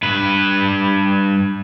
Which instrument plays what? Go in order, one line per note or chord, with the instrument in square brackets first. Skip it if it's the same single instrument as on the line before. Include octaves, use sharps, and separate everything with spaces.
[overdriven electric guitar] G2 B4